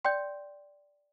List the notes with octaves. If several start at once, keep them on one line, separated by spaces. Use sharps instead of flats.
D5 G5 C6 G6